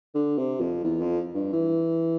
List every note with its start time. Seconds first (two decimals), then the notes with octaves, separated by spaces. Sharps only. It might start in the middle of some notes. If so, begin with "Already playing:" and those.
0.15 D3
0.38 C3
0.61 F2
0.84 E2
1.01 F2
1.34 G2
1.53 E3